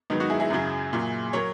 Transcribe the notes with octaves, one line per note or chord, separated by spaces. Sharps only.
G#2 D#3 F#3 B3 D#4
D#4 F#4
E4 G#4
E4 G#4
F#2 C#3 F#3
A#2 F#3
F#3 A#4 C#5